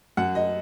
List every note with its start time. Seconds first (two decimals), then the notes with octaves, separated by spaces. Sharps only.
0.17 F#2 F#5
0.35 D#5